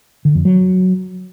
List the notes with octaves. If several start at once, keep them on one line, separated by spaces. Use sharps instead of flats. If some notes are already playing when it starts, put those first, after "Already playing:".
D3
F2
F#3